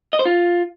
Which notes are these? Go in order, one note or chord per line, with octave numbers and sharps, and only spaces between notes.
D#5
C5
F4